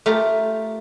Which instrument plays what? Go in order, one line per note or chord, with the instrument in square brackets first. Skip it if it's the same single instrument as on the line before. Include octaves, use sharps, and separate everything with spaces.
[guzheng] A3 F4 G4 A#4